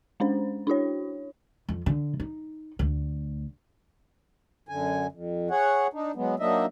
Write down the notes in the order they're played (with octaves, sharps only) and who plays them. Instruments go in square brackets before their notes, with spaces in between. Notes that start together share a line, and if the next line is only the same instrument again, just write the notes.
[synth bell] G#3 C#4 D4 C5
D4 E4 F#4 C#5
[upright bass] F2
D3
D#4
D2
[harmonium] F#2 D3 G#5
F2
G#4 C#5 F#5
D4 D#4
F#3 G#3 B3
F#3 A#3 D4 D#4 D#5 E5